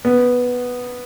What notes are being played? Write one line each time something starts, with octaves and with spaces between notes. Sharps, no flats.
B3